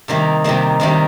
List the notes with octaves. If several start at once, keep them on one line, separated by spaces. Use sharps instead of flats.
C3 D#3 G3 A#3
C3 D#3 G3 A#3
C3 D#3 G3 A#3